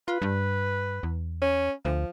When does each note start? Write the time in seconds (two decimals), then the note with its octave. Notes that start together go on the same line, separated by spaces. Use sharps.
0.08 F4 B4
0.22 G2
1.03 E2
1.42 C#4
1.85 D2 F3